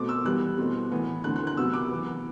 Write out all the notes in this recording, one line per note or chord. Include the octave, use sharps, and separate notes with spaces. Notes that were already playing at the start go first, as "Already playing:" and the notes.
Already playing: B2 A3 C4 D6
E6
E3 G3 B3 F#6
B2 A3 C4
A2 E3 B3
D3 A3 C4 F#6
F#6
F#6
C3 F#3 B3 E6
D6
E3 B3